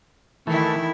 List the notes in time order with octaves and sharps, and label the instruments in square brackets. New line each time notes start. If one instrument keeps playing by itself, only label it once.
[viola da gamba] D#3 E4 [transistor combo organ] E3 A3